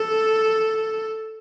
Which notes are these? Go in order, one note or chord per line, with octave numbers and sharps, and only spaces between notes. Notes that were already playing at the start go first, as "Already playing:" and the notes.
Already playing: A4